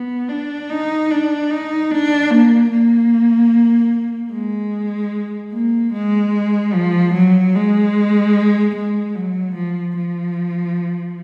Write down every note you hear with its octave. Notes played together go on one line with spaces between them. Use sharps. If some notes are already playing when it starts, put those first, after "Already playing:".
Already playing: B3
D4
D#4
D4
D#4
D4
A#3
A#3
G#3
A#3
G#3
F3
F#3
G#3
G#3
F#3
F3
F3